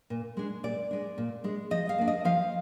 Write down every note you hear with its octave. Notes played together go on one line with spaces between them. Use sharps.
A#2
G#3 D4
A#2 D5
G#3 D4
A#2
G#3 D4
F3 D#5
F5
A#3 D4
D#5
F3 F5